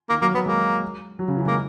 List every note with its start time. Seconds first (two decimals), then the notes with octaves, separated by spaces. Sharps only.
0.09 D#3 A#3
0.21 F#3 A#3
0.34 F#3 B3
0.46 G#3 A#3
1.19 F#3
1.28 C#3
1.37 E3
1.46 G#3 A#3